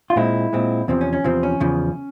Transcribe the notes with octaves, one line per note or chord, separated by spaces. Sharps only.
F4
A#2 G#3 C4 E4
A#2 G#3 C4
E2 C3 F3 C4
C#4
C#4
E2 C3 F3 C4
C#4
E2 C#3 F3